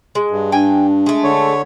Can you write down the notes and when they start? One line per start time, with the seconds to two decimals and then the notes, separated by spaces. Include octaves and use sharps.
0.15 G#3
0.31 G2
0.52 D4 G5 G#5
1.06 G#3 A3
1.24 D3 C#5